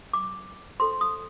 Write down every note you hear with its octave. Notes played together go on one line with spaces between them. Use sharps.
D6
F4 A4 C5 C6
D#6